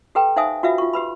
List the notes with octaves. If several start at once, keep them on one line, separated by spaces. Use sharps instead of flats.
G4 A4 B4 G5 A#5
D#4 C5 E5 F5 G#5 D#6
F4 F#4 B4 E5 F5
F4 C#6
G4 B4 B5